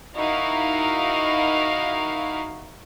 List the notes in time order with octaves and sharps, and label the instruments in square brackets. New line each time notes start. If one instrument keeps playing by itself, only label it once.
[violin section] D#4 E4 F#4 A#4 F5